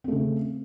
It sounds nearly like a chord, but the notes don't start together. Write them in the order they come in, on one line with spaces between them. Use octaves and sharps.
C4 A3 C#3